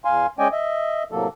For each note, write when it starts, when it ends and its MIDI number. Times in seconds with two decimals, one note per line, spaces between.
0.05 0.26 40
0.05 0.26 77
0.05 0.26 80
0.05 0.26 84
0.39 0.48 56
0.39 0.48 61
0.39 0.48 74
0.39 0.48 75
0.39 0.48 79
0.39 0.48 80
0.52 1.03 75
0.52 1.03 76
1.12 1.28 45
1.12 1.28 48
1.12 1.28 54
1.12 1.28 58
1.12 1.28 69